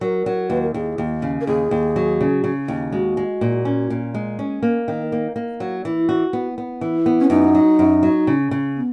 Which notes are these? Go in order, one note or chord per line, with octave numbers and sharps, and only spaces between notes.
F#3 A#4
F#3
D#2 B4
A#4
D#2 G#4
D#2
C#3
A#4
D#2 G#4
D#2
F#3
C#3
C#3
D#2
G#3 F#4
G#3
A#2
C#4
A#2
G#3
C#4
A#3
D#3
A#3
A#3
F#3
E3
F#4
B3
B3
E3
B3
C#4
F#2 D#4
F#3
F#2
F#3
C#3
C#3
B3